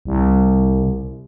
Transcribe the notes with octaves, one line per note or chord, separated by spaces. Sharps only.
C2